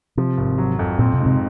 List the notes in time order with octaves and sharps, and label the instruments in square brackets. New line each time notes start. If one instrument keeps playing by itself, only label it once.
[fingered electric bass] C3 [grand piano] F3
[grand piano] G#1
F#3
F2
[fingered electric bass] A#2 [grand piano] C4
[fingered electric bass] C3
[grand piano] G#2
[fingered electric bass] C3